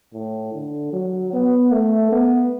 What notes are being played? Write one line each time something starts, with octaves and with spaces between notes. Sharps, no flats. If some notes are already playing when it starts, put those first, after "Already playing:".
A2
D3
F#3
B3
A3
B3